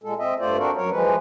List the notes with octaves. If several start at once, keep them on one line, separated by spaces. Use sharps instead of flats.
A#2 G#3 A4
C4 D#5 E5
G2 A3 F4 C5 D5
C4 D4 F#4 A4 A#4
F#2 F#3 A#4 C#5
E3 F3 G#3 B4